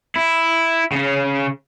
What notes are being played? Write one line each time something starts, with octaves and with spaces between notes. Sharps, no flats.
E4
C#3 C#4